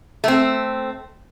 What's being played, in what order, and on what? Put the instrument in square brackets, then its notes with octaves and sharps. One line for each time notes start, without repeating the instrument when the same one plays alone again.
[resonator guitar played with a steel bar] A3 C4